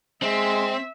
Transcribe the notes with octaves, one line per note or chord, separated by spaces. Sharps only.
G#3 C4 E5